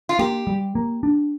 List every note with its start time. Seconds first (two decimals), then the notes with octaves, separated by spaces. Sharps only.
0.09 F4
0.19 A#3 G4
0.47 G3
0.75 A#3
1.03 D4